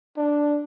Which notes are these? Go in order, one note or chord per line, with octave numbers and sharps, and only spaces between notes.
D4